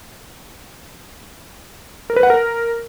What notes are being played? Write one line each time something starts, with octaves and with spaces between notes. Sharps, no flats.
A#4
B4
F#5
A#4